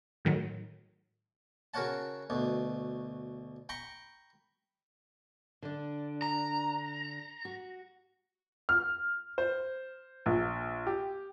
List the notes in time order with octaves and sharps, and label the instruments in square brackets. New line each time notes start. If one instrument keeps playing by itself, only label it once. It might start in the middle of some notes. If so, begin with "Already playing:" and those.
[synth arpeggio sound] A2 D#3 F#3
[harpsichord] C#3 F#4 A#4 C#5 F#5 A5
D2 B2
G5 A#5 B5 C#6
[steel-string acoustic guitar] D3 D4
[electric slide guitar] A#5
[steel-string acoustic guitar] F#4
[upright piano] F6
C5
A#1
G4